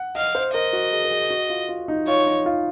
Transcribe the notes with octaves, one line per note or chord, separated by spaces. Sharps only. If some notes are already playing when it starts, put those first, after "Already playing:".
Already playing: F#5
D#5 F5
C5
A#4 D#5
F#4
G#4
A#4
G#4
F#4
F4
F4
D#4
F4 C#5
D#4
F4